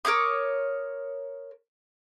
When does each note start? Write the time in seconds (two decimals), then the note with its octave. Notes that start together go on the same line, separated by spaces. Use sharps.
0.05 A#4 C#5 D6 D#6